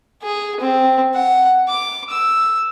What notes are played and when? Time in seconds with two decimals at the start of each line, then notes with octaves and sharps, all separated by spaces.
0.23 G#4
0.60 C4
1.14 F#5
1.68 D6
2.11 E6